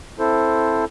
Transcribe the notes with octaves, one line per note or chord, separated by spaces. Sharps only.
C4 E4 A4 C5